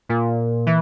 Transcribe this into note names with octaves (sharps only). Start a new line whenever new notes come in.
A#2
E3